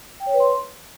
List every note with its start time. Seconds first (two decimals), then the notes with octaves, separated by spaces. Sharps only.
0.20 G5
0.27 C#5
0.33 B4
0.40 C6